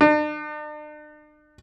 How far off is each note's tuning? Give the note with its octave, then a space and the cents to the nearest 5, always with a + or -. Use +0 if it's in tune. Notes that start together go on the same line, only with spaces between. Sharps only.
D4 +45